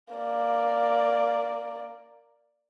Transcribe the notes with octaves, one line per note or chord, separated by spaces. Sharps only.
A#3 D5